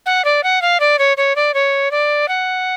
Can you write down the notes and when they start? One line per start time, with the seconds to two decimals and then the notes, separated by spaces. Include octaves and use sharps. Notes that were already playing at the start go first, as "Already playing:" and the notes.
0.06 F#5
0.25 D5
0.44 F#5
0.62 F5
0.80 D5
0.99 C#5
1.17 C#5
1.36 D5
1.54 C#5
1.91 D5
2.28 F#5